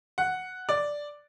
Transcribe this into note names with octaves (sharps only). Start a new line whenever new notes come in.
F#5
D5